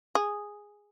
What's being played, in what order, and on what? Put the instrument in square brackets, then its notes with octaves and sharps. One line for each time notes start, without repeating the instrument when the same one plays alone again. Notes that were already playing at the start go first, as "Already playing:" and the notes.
[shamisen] G#4